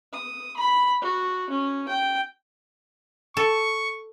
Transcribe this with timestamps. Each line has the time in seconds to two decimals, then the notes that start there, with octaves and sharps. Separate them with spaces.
0.13 D#6
0.57 B5
1.02 F#4
1.50 C#4
1.88 G5
3.37 A4 C#6